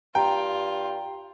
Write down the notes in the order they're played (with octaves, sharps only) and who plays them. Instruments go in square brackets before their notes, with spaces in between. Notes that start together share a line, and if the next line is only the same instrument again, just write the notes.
[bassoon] G2 [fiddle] F4 [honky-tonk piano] G5 [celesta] A#5